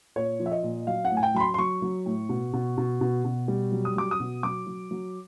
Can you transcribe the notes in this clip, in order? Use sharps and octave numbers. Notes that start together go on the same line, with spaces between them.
A#2 C#5
F3
E5
D#5
A#2
F#3 F5
F#5
A2
G#5
G5
F#3 B5
C6
C6
F#3 C#6
F#3
A2
B2
B2
B2
B2
B2
G3
F#3
D#6
F#3 D6
D#6
B2
F#3 D6
F#3
F#3